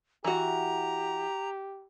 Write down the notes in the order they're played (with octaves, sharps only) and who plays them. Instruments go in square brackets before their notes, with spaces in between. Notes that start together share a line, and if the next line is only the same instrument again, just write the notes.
[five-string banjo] E3 F#4 [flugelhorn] G4 [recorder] A#5